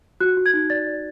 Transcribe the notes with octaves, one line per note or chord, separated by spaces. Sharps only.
F#4 F#6
F#4
G#6
D#4
D5 A6
D5